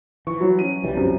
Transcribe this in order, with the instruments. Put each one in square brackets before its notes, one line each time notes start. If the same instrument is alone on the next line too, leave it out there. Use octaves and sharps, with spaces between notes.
[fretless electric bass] E3 [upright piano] C#6
[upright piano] F#3
C#4 D#7
[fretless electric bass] C2 E3 G3
[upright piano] F#2 C3